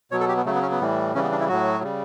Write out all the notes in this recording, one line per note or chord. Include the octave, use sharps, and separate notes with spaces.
B2 F#3 C#5
A4
G4
B3
C#3 F#3 A3
B3
C#4
B3
A2 E3 G3
C#3 E3 G3 C#4
B3
D4
E4
A2 F#3 F#4
C#3 G3